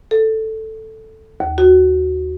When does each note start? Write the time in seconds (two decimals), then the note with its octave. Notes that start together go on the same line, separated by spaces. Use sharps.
0.11 A4
1.40 D#2
1.58 F#4